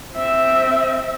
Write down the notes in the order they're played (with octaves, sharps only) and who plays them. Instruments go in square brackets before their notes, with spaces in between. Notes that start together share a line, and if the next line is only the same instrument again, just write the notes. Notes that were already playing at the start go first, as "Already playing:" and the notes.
[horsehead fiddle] C4 E5